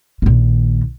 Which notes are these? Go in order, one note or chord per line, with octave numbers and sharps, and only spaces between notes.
A#1 D#3